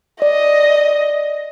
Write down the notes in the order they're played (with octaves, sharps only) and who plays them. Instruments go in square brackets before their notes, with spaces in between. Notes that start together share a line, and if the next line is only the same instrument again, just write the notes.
[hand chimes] D5 [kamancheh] D#5